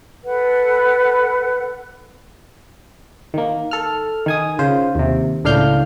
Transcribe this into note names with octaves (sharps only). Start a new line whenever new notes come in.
A4 B4 F#5
D#3 A#3
A4 F6
D#3 G#5 D#6
C#3 F4 C5
D#2 C3
C#2 A2 D4 F5 F6 G6